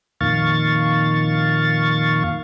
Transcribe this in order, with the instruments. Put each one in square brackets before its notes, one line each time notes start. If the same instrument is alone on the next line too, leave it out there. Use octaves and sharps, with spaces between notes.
[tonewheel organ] F2 A#2 D#3 F5 C#6 A6